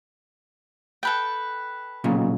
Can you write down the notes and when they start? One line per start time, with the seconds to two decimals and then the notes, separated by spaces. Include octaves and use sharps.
1.03 A4 B4 G5
2.04 B1 A#2 C#3